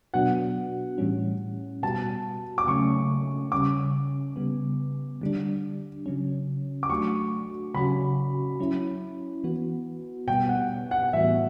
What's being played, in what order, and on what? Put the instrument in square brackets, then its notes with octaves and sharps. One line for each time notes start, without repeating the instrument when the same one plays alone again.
[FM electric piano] B2 F#3 B3 D4 F#4 [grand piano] F#5
[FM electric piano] A2 E3 G3 C#4
[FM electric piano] B2 G3 B3 F#4 [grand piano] A5
[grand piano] D6
[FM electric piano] C#3 F#3 A3 C#4 [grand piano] C#6
[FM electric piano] C#3 G3 C#4 [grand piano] D6
[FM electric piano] C#3 G3 B3
D3 G3 D4
C#3 F#3 C#4
[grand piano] D6
[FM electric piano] F#3 A3 D4 F#4 [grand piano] C#6
[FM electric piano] C#3 F#3 C#4 F#4 [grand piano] B5
[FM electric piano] F#3 C#4 E4
E3 B3 F#4
[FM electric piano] B2 G3 B3 [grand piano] G5
[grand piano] F#5
F#5
[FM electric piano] A2 E3 G3 B3 F#4 [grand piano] E5